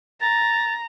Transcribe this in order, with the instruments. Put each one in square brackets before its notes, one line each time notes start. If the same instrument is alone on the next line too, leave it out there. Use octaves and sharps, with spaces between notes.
[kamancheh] A#5 [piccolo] A6